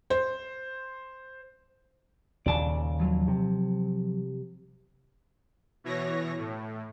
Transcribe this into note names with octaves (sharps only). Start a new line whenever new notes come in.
C5
D#2 A#2 C#3 D5 A5
F3 F#3
C3
B2 E3 C#5 A#6
A2